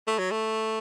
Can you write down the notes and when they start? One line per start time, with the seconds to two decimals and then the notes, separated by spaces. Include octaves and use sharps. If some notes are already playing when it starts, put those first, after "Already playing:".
0.07 A3
0.19 F#3
0.31 A3